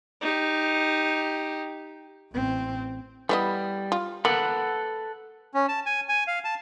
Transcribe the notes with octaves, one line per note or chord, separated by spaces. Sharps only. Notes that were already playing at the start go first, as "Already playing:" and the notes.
D#4 G4
A1 C4
E3 G3 B3 D#5
F4
A#3 A4 B4 F#5
C#4
A5
G#5
G#5
F5
A5